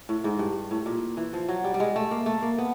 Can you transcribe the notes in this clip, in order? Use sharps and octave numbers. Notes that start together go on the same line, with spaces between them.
A2
G#2
G2
A2
A#2
E3
F3
F#3
G3
G3
G#3
A3
A#3
A3
A#3
B3